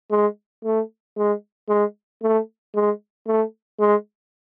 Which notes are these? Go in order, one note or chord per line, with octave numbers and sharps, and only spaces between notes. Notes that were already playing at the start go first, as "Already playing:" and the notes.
G#3
A3
G#3
G#3
A3
G#3
A3
G#3